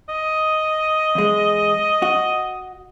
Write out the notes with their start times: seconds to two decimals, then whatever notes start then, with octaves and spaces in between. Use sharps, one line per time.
0.09 D#5
1.15 E2 G#3
2.02 F#4